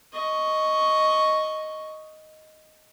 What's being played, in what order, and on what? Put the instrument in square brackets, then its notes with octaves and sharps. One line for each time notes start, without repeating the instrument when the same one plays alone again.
[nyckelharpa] D#5 C#6